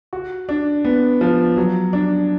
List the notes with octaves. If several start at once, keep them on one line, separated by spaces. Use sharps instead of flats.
F#4
D4
B3
F3
F#3
D4